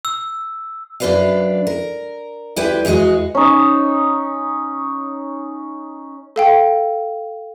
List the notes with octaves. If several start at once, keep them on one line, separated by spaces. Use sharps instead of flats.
E6
F#2 D4 A#4 B4 D5 F5
A#4
D2 G3 E4 B4 G5
E2 E3 G#3 F#4 D#5
C#4 D#4
A4 F5 G5